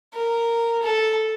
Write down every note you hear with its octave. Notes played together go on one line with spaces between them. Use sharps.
A#4
A4